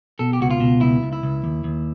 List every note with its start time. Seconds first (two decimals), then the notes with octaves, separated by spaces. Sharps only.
0.19 B2 A4
0.33 G4
0.41 C#2 F#4
0.51 F4
0.60 B2
0.81 C#2 E4
1.03 C#2
1.13 E4
1.23 C#2
1.44 D#2
1.64 D#2